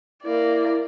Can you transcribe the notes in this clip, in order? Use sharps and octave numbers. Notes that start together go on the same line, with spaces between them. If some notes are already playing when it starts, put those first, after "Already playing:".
A#3 E4 D5